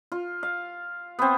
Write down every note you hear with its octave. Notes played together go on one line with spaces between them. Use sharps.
F4
F5
B3 C4